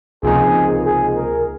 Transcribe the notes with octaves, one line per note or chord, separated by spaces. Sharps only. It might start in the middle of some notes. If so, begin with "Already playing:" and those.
C#2 C3 F3 A#3 D#4 G#4
G#4
A#4